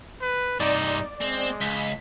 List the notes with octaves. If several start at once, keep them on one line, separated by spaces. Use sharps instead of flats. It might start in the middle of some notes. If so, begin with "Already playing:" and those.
B4
G2 C3 D#4 D5
G#3 C4
C#2 B6